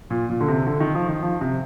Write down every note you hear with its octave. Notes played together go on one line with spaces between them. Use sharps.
A#2
A#2
D3
C3
D3
D#3
F3
D#3
F3
C3